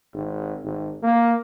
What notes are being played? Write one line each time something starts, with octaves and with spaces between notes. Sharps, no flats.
G#1
G#1
A#3